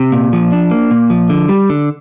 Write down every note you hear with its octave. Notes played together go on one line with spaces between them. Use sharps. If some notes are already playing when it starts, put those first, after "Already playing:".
Already playing: C3
A#2
F3
D4
A#3
A#2
F3
D3
G3
D3